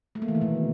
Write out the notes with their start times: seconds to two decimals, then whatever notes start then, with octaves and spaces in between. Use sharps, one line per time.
0.15 A3
0.22 A#3
0.28 E3
0.35 D#3
0.41 B2